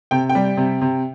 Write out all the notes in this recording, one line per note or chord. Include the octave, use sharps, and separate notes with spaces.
C3 G5
G5
G3
C3
C3